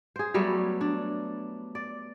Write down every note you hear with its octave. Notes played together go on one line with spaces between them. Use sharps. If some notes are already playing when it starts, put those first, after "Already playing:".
G#4 C5
F#3 G3 A3 B3
D4
D5